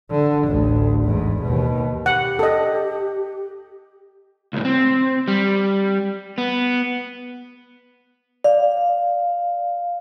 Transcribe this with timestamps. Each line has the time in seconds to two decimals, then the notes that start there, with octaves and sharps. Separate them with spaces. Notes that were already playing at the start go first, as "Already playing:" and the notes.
0.11 D3
0.46 A1 D2
1.03 E2 G#2
1.43 D#2 B2
2.06 G4 F#5
2.39 A4 D#5
4.53 C#2 A2
4.65 C4
5.28 G3
6.38 B3
8.44 D5 F5